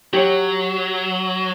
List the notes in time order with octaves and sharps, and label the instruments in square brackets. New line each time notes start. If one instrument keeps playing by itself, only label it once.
[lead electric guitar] F#3 [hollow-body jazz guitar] G4 C#5